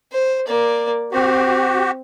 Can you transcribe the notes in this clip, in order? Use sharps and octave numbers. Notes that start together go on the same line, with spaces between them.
C5
A#3 D5
C4 F#4 G4